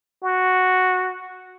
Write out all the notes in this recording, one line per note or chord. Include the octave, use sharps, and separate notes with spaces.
F#4